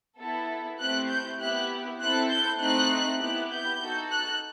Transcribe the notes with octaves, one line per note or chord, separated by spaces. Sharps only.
B3 E4 A4
A3 C4 E4 G4 F#6
G6
B3 E4 G4 F#6
C4 E4 A4 F#6
G6
A3 C4 D#4 F#6
B3 E4 G4 F#6
G6
D#4 F#4 A4
F#6